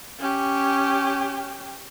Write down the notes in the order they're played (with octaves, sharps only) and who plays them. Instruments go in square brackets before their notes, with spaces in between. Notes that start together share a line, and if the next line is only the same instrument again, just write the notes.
[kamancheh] C#4 G4